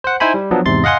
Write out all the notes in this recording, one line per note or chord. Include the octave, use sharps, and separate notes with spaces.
C5 F#5
D#4 E4 C5 G#5 B5
G3
F3 F#3 B3 D4
E2 G#2 C3 C6 A6
D#5 F5 F#5 G#5 C6